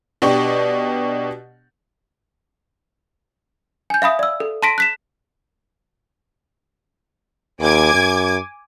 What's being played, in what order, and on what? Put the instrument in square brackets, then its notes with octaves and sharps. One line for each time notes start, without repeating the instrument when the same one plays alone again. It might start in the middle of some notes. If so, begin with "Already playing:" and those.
[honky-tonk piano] B2 D4 G4 C#6
[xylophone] G#5 G6
E5 F5 B5 D#6
D5 E6
A4
A5 C6 A#6 B6 D7
F#6 B6 E7
[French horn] D#2 [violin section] G#5 D6 G#6
[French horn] F#2